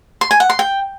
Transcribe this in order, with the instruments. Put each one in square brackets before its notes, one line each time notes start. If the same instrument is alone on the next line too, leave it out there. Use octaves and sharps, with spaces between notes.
[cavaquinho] C6
G#5
F#5
C6
G5